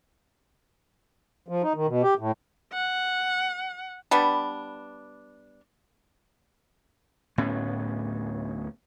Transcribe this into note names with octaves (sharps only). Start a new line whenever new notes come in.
F3
D#4
D#3
B2
G4
A2
F#5
G3 B3 D4
D1 A2 B3 C#4